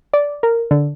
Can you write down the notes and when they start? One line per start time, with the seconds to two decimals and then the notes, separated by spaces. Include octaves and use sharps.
0.14 D5
0.43 A#4
0.71 D3